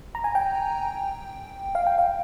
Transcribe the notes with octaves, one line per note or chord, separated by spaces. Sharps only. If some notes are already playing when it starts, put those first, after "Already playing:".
A#5
G#5
G5
F5
G5
F5